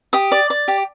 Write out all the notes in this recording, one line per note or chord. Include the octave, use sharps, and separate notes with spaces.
G4 D#6
D5
D5
G4